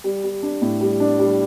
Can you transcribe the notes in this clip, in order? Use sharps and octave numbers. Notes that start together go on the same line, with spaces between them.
G3
G3
D4
A2
G3
D4
G3